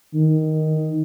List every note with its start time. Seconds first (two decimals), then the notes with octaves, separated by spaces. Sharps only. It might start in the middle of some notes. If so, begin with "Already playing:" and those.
0.15 D#3